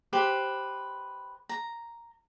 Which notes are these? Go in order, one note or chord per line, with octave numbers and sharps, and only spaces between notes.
G4 B4 C5
A#5